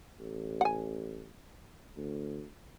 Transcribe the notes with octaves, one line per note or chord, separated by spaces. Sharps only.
A1
F#5 G#5
D2